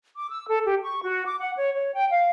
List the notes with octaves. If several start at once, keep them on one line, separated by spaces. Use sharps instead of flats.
D6
E6
A4
G4
C#6
F#4
D6
F#5
C#5
C#5
G5
F5